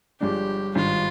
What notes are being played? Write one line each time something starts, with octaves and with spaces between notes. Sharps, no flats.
G1 G2 F3 G#3 D4 G4
G#1 G2 D#3 F4